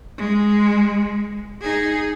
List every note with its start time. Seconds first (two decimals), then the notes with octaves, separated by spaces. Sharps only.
0.18 G#3
1.61 D#4 G#4